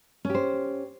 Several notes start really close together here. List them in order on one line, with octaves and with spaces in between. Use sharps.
C#4 G4 C5